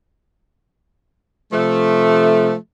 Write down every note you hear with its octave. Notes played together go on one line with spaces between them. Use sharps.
C3 F3 A3